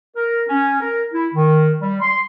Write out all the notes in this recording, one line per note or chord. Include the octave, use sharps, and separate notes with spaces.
A#4
C#4
A#4
E4
D#3
G3
C6